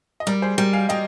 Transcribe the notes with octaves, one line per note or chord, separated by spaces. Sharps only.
D#5
G3 A#4 D5
G#4 C5
G3 G4 A#4
F5 G#5
G3 D#5 G5